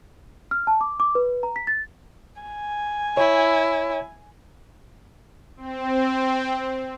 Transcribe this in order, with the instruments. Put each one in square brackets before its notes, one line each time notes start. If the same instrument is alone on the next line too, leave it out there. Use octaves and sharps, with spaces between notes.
[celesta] F6
A5
D6
D6
B4
A#5
B6
A6
[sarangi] G#5
[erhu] E4 [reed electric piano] C#5
[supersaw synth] C4